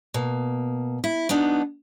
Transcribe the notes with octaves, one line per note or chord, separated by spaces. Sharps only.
B2 A#3
E4
F#3 B3 D4 D#4